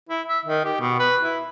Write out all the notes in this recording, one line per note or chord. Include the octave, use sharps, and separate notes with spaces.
E4
E5
D#3
G4
B2
B4
E4